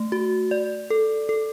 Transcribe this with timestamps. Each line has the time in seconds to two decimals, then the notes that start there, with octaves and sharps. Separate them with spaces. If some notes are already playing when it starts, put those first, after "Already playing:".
Already playing: A3
0.12 F#4
0.51 D5
0.90 A4
1.29 A4